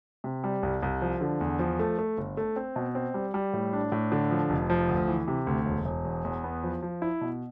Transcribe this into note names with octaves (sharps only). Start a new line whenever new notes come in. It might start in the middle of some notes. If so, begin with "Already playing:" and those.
C3
G3
C2
C2
F3
D3
E2
F3
A3
A3
G1
A3
C4
B2
C4
G3
G3
A2
D4
A2
D3
F3
F1
F3
D2
E3
C3
D2
E1
E1
E2
E2
B3
F3
F3
E4
B2